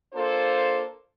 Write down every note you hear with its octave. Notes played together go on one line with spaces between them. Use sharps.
A#3 D4 F4 A4 C5